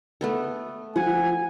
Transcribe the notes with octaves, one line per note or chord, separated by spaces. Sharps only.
A3 B3 A4
F3 F#5 G#5